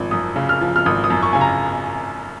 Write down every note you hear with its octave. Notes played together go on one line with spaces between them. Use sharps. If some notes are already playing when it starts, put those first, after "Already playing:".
Already playing: G#1 F3
F#2 D#6
C#3
F6
F3
F6
G#1 D#6
D#6
F#2
C#6
C#3 G#5
A#5